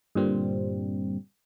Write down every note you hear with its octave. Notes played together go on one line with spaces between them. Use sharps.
G2 A#2 D3 G3 C4